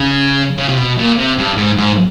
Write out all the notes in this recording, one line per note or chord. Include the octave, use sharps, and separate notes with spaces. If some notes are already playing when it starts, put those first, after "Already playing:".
Already playing: C#3
C#3
C3
B2
A#2
C3
G2
G#2
G#2